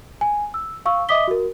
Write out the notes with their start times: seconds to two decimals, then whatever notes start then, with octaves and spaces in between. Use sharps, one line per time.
0.21 G#5
0.54 E6
0.86 F5 C#6 E6
1.09 D#5 E5 D6 D#6 B6 G7
1.28 F#4 A#4